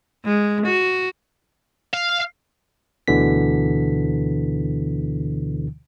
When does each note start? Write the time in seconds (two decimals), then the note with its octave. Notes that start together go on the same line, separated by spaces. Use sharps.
0.25 G#3
0.66 F#4
1.93 F5
3.08 D2 B2 D3 E3 B6